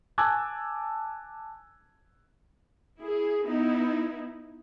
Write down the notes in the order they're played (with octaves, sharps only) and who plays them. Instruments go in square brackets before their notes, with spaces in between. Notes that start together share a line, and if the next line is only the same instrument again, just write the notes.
[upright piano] G#5 A5 D6 E6 F#6 G#6
[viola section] E4 G#4
B3 D#4 E4